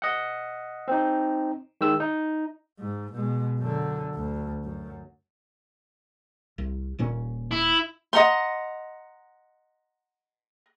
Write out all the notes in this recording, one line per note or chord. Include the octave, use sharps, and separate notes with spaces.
D#5 F#5
C4 D#4
D#3 G#3 E6
D#4
G#2
B2 G#3
F#2 D3
D2
F#2
C2
D#1 A#2 C#4
E4
D#5 F#5 A#5 C6